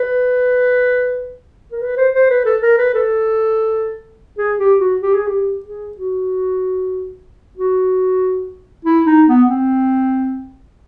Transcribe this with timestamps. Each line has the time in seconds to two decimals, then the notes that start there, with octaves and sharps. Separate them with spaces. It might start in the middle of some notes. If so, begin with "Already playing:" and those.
Already playing: B4
1.72 A#4
1.82 B4
1.98 C5
2.14 C5
2.30 B4
2.46 A4
2.62 A#4
2.78 B4
2.94 A4
4.38 G#4
4.59 G4
4.80 F#4
5.02 G4
5.14 G#4
5.27 G4
5.66 G#4
5.98 F#4
7.58 F#4
8.85 E4
9.06 D#4
9.28 B3
9.49 C4